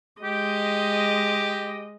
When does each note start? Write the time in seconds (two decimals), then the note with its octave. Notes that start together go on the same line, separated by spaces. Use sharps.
0.22 G#3 G4 D#5